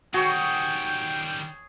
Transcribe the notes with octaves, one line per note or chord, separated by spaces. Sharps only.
D#3 G3 F#4 G#4 C#5 G5